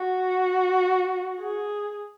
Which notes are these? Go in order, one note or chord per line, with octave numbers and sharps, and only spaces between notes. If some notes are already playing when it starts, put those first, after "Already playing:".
Already playing: F#4
G#4